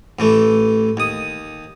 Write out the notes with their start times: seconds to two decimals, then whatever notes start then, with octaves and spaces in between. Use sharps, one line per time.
0.19 A1 E3 A3
0.97 D#2 D#6